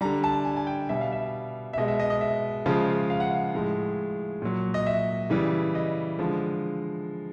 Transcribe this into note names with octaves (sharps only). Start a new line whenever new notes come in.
D3 G3 A#5
A5
G#5
G#5
G5
B2 G3 E5
F5
E5
E5
B2 G#3 D#5
E5
D#5
D#5
E5
C#3 F3 G#3
F5
F#5
F5
A2 F3 G#3
A#2 F#3
D#5
E5
C#3 E3 G3
D#5
D3 F3 G#3